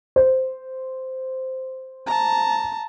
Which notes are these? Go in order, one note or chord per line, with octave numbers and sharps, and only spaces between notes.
C5
A5 A#5